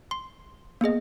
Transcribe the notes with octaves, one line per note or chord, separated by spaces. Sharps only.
C6
A#3 B3 G#4 D#5